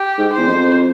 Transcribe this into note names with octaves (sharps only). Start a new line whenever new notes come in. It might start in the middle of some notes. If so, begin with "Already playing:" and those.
Already playing: G4
G#2
E2 C5
F2